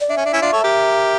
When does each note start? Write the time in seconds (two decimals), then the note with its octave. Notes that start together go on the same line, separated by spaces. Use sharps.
0.01 D5
0.10 D4 E5
0.17 C#4
0.26 D4
0.33 C#4 E4
0.42 D4 F4
0.53 A4 C#5
0.63 G4 A#4